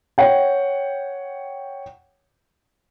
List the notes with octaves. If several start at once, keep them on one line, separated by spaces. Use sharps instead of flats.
C#5 F#5 G5